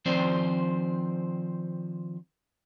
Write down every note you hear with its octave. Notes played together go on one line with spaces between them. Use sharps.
D#3 F3 C4 C5 D5